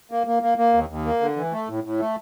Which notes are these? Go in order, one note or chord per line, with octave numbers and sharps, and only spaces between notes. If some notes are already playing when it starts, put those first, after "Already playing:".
A#3
A#3
A#3
A#3
D#2
D#2
A#3
D3
E3
A3
A2
A2
A3